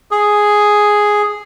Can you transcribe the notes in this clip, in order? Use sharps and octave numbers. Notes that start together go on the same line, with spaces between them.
G#4